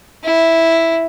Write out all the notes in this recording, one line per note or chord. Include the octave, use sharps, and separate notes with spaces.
E4